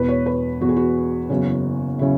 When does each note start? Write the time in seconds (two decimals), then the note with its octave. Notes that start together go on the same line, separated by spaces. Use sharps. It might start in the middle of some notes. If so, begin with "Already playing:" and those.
Already playing: E1 E2 B2 B4
0.09 C#5
0.26 B4
0.61 E1 E2 B2 F#4
0.69 G#4
0.76 F#4
1.29 F#1 E2 C#3 F#3 C#4
1.99 C#3 F#3 C#4 E4